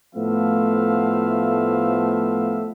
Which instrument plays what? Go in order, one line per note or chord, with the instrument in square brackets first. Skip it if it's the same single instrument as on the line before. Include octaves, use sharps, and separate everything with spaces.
[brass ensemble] A2 F3 A3 B3 E5 F5